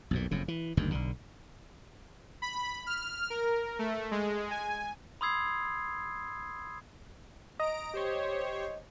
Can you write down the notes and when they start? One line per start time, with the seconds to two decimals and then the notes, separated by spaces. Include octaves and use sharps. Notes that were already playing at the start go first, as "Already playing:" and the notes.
0.11 B1 F2 A#2
0.31 F#1 F2 C#3
0.48 E3
0.77 F#1 D2 G2 D#3
0.92 B1 D3
2.42 B5
2.87 F6
3.30 A#4
3.79 A3
4.11 G#3
4.51 G#5
5.21 B5 C6 D#6 E6 G#6 C7
7.60 D#5 A#5 D7
7.94 G4 C5 C#5